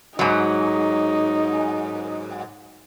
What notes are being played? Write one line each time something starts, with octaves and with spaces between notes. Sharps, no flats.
G#2 F#3 D#4